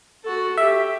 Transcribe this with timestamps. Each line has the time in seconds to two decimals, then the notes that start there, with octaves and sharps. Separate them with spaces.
0.23 F#4 A4
0.57 G4 E5